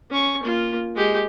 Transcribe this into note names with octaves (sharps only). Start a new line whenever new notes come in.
C#4 C#6
A#3 F4
G#3 G4